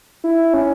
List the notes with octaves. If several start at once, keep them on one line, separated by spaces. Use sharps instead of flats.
E4
C#4